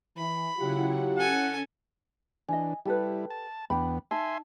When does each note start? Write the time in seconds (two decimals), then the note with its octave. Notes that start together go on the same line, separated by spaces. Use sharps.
0.17 E3 B5
0.57 C#3 F#3 E4 F4 G4 F#5
1.17 C#4 A4 F#5 G#5
2.49 E3 D4 D#5 G#5
2.86 G3 E4 G4 A4 B4
3.30 A5
3.70 E2 B3 D4 G5 B5
4.11 D#4 E5 G#5 A5 C6